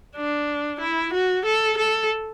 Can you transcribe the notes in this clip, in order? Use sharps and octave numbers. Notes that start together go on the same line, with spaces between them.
D4
E4
F#4
A4
A4